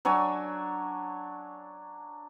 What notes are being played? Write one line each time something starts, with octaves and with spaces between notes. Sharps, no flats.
F#3 D4 C#5 G#5